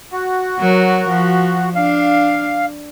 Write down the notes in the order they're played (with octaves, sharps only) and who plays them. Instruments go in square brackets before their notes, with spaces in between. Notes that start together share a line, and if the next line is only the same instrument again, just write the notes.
[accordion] F#4
[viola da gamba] F#3 A#4
F3
[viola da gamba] D4 [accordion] F5